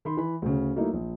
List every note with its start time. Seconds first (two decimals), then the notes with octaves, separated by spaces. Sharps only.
0.05 D#3 B5 C6
0.17 E3 B5
0.42 D2 C#3
0.76 F#3 A3 A#3 D#4 E4
0.93 A#1